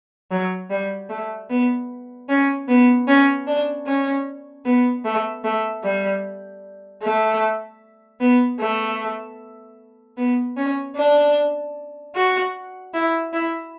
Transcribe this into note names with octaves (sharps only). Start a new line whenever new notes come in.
F#3
G3
A3
B3
C#4
B3
C#4
D4
C#4
B3
A3
A3
G3
A3
B3
A3
B3
C#4
D4
F#4
E4
E4